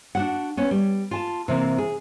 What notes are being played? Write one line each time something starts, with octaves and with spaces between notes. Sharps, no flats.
D4 F#4 F#5
B3 C#4
G3
F4 G#5 A5
C3 E3 A#3 C4
G#4